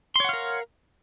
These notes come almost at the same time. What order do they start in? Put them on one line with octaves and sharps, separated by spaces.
C6 C#5 F#5 F5 A#4